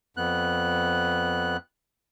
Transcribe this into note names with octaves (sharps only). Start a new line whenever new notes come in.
F2 B3 F#6